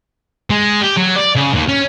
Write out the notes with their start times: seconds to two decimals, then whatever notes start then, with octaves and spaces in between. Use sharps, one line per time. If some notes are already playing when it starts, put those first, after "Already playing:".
0.50 G#3
0.81 G4
0.97 F#3
1.16 D5
1.36 C#3
1.55 D#2
1.69 C#4